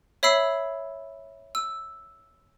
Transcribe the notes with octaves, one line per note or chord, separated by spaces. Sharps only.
C#5 E5 B5 E6 C7
E6